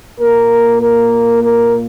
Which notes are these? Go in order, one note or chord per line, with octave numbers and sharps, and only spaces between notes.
A#2 A#3 A#4
A#4
A#4